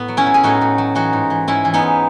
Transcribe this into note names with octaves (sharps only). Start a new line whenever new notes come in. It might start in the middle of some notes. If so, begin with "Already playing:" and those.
Already playing: A2 B3
F#3
C#4 E4
F#3
G#4
A2 D#4 F#4
A2
F#3
E3 D#4 F#4
G#2
E3
G#2 C#4 E4
E3
B3 D#4
G#2